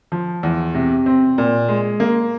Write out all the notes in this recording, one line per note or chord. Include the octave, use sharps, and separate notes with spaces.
F3
E2
C3
C4
A#2
G#3
A#3